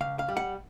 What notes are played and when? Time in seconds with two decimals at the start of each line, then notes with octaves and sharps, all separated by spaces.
0.01 C#2 F5
0.19 F5
0.28 G3
0.37 F#5